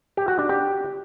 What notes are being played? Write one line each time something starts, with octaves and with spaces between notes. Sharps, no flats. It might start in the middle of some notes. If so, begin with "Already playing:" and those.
G4
F#4
D4
G4